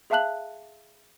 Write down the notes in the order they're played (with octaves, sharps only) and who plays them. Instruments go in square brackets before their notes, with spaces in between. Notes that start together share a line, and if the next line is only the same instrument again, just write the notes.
[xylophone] G#4 E5 F5 A5 F#6 F#7